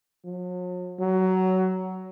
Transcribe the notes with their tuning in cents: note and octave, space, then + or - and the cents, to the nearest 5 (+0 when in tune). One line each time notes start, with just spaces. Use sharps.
F#3 -45
F#3 +15